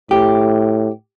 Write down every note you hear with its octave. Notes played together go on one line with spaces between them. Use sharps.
A2 G4